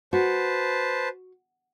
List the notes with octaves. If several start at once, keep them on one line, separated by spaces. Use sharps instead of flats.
F#4 B4 C5 A5